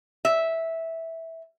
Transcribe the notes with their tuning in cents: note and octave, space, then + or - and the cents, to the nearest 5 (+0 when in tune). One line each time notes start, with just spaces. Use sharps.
E5 -10